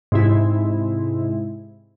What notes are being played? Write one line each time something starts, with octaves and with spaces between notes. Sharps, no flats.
G#2 C3 E4